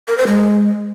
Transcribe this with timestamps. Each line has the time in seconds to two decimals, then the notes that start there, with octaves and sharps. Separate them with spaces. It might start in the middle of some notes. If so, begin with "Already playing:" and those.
0.08 A#4
0.18 C5
0.27 G#3